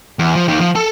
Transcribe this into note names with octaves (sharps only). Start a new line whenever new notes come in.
E2
F3
D#2 D#3
F3
A4 A5